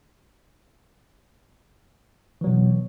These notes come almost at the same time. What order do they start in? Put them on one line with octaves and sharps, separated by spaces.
E3 F#3 B2